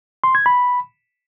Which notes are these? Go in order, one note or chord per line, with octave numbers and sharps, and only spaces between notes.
C6
G#6
B5